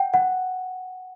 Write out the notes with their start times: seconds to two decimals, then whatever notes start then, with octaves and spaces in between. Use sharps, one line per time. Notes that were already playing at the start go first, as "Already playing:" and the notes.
Already playing: F#5 G5
0.14 F#5